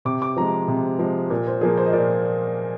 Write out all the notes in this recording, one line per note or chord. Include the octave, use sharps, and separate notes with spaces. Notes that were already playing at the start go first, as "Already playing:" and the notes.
C3 D6
D6
F3 G#3 A#5
C3
F3 G#3
A#2
C5
F3 A#3 G#4
C5
D#5
A#2 D5